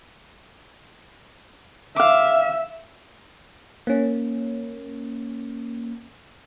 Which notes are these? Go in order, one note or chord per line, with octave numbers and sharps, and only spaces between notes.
E5 F5 D6
A#3 C#4